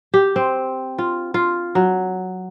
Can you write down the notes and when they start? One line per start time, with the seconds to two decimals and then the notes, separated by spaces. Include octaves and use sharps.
0.14 G4
0.36 C4
0.98 F4
1.34 F4
1.75 F#3